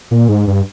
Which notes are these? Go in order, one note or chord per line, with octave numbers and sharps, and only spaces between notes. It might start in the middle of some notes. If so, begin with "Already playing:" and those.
A#2
G#2
G2